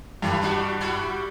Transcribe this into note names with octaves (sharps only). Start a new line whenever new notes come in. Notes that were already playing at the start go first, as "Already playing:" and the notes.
G2 D#3 A3 E4
G3 D4 F#4
G3 E4 F#4